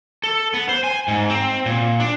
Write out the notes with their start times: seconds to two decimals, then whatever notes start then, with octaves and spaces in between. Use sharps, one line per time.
0.23 A4
0.54 B3
0.69 C5
0.84 G#5
1.08 G#2
1.30 C4
1.66 A#2
2.00 D4